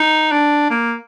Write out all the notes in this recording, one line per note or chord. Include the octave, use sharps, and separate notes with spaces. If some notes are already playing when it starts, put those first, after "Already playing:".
Already playing: D#4
D4
A#3